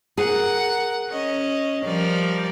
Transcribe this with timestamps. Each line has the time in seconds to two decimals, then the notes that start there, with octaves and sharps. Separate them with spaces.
0.18 G#4 A#4 F#5
1.11 C#4 D#5
1.86 F3 G3 A#4 D5